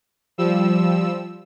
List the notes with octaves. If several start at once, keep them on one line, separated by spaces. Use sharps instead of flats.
F3 G3 E6